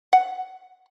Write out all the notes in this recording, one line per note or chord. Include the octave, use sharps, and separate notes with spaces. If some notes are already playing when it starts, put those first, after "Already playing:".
F#5